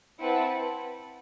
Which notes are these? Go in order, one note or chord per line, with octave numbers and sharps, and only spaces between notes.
C4 E4 B4 F#5 A5